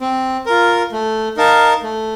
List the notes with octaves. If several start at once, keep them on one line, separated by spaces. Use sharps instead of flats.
C4
F4 A#4
A3
D#4 A#4 F5 A5
A3